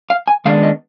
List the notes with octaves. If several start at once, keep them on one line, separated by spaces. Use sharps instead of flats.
F5
G#5
D#3 G#3 B3 D4 F5
D#5